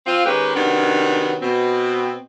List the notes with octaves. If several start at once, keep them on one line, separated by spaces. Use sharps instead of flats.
C4 F4
D#3 G#3 C#4 G4 B4
C3 D#3 F#3 B3 C#4 D4
B2 C4